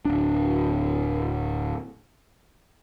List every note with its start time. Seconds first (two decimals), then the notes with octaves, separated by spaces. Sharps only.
0.05 D1 D4